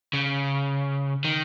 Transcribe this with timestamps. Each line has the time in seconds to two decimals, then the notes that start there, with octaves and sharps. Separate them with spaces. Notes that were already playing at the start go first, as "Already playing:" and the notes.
0.13 C#3
1.24 D#3